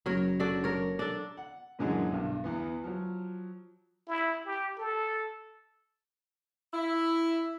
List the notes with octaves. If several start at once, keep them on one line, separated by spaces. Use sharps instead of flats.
F#1 F#3 A#4 C#5
D4 F#4 A4
A#4 C#5
D4 A4
F#5
F#2 A#2 D3 E3 F#3 G#3
B1 G2
E2 E3 B3
F3 F#3
E4
G4
A4
E4